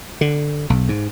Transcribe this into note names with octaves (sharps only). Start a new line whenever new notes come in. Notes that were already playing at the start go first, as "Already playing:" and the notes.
D3
B1
G#2